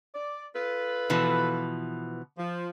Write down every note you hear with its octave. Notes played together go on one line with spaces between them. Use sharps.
D5
F4 A4 B4
B2 E3 F3
F3